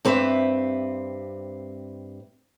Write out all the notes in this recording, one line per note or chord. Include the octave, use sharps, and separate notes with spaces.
G2 C4 G4 B4 C5 E5